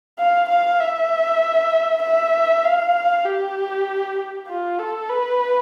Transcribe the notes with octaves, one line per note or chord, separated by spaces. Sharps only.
F5
F5
E5
E5
F5
G4
F4
A4
B4